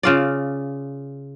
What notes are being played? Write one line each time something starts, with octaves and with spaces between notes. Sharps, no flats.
C#3 F4 D5